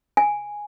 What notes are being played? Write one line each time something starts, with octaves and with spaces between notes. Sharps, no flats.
G#5